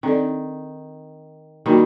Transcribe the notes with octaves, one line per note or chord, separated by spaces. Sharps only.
D#3 C4 D#4 A4 D5
D#3 G3 A#3 D#4 F#4 A#4